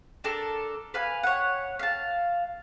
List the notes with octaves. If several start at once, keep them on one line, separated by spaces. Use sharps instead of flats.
D4 A4 A#4
B4 F5 G#5
C#5 F#5
F5 A5